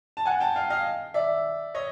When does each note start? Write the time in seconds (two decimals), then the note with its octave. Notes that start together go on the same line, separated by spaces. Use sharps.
0.17 A5
0.26 F#5 G#5
0.40 G5 A5
0.56 F5 G5
0.70 D#5 F5
1.14 D5 E5
1.75 C#5 D#5